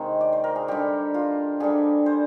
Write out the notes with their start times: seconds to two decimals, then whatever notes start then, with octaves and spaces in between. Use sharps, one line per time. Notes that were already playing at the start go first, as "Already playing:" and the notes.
Already playing: C3 D#3 G#3
0.21 D5
0.33 C5
0.44 A#4
0.56 G#4
0.68 D3 G3 G4
1.14 F4
1.60 D3 G3 G#4
2.06 C5